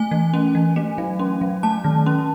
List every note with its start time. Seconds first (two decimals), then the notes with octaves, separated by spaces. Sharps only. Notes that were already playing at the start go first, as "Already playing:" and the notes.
Already playing: A3 G#5
0.11 E3
0.34 C#4
0.55 E3
0.76 A3
0.98 F#3
1.19 C#4
1.41 F#3
1.63 A3 A5
1.84 D#3
2.06 C#4